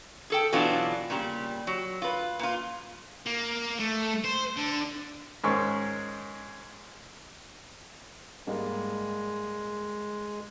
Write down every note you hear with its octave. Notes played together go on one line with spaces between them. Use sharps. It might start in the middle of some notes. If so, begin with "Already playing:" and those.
G#4 A4 G5
B2 E3 F#3 B3 D4 F4
A#2 C#3 G3
F#3
F4 B4
A#2 F4
A#3
A3
C5
D3
G#2 D#3 G#3 C#4 C#6
G#2 G3 G#3 A#3